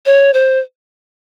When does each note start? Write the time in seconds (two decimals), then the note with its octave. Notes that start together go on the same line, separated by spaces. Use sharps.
0.06 C#5
0.34 C5